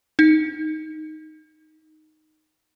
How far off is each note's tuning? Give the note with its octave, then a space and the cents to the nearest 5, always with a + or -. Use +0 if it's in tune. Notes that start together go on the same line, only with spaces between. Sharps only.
D#4 +0